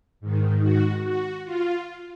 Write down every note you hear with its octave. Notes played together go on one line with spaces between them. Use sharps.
G#2 D#3
F#4
F#4
F4